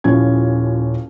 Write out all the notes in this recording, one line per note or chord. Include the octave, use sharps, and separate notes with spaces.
D#1 D#2 F3 C#4 E4 G#6